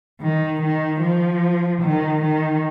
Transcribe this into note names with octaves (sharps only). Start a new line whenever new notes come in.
D#3
D#3
F3
D#3
D#3